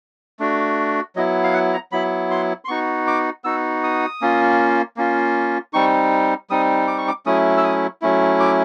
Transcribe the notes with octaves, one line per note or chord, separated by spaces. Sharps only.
A3 D4 F#4
F#3 B3 E4 D#5
F5
F#5
A#5
F#3 B3 E4 B5
C6
C6
B3 D#4 F#4 C#6
D6
B3 D#4 F#4 E6
D#6
A#3 C#4 F4
A#3 C#4 F4
G3 C4 D#4 C#6
G3 C4 D#4 D#6
D6
C#6
D6
F#3 A3 C#4 E4 D#6
E6
D#6
F#3 A3 C#4 E4
D6